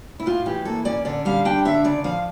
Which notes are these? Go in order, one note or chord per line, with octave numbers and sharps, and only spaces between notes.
E4
A2 F4
E3 G4
A#3 A4
C#4 D5
D3 D5
G3 F5
D4 G5
D3 E5
C#3 D5
F3 F5